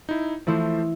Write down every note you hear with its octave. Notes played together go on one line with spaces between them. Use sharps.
D#4 E4
E3 F3 A3 E4 C5 C6